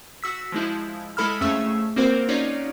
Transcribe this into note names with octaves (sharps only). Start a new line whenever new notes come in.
F#4 E6 B6
F3 G#3 E4
G#3 E4 A4 B5 E6 F6
F2 A3 C#4 G#4 E5 E6
A#3 C4 F#4 A#4 C5
C#4 D#4 F4 F#4 C#5 D5